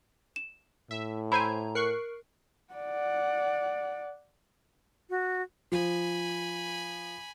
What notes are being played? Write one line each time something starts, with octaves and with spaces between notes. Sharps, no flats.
E7
A2 E5
E4 C5 G#5 A#5 B5 D#7
A#4 C#6 F#6 C7
D5 F#5
F#4
F3 G#5 B5